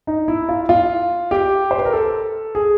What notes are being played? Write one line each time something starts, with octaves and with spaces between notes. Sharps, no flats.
D#4
E4
F4
F4
G4
C5
B4
A#4
A4
G#4